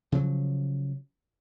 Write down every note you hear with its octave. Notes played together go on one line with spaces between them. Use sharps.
C#3 F3 F#3